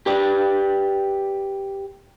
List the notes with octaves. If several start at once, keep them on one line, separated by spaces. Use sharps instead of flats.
G4 B4 D5